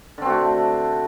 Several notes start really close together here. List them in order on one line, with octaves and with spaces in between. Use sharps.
D3 C4 F#4 A3